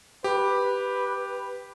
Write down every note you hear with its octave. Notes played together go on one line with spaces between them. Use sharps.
G4 B4